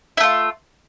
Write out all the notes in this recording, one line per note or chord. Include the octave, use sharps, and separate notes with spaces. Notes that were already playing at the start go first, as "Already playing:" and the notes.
A3 E4 F4